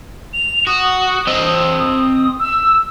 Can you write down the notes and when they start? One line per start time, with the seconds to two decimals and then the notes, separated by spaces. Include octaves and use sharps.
0.33 F7
0.67 F#4 D#6
1.27 C4 D#5
2.39 E6